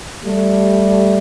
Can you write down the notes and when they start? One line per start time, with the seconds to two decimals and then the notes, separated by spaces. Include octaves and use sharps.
0.23 G3 A3